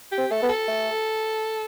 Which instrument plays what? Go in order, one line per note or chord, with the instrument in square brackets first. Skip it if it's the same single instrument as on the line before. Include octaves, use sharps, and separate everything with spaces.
[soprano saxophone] G4
[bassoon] C4
[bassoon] A3 [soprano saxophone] A4
[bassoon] B3
[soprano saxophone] A4
[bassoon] A3